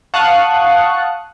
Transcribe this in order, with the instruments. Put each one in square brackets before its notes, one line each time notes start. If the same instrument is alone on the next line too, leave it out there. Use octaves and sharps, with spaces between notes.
[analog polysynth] F5 F#5 A5 C#6 D#6 F#6